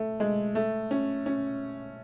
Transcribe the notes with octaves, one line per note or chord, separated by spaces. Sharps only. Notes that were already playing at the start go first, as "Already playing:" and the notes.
Already playing: A3
G#3
A3
C#4
C#4